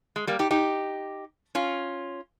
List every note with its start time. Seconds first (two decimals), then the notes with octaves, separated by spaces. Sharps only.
0.16 G#3
0.27 G3 A#3
0.39 D#4 G4
0.51 D#4 G4
1.55 C#4 F4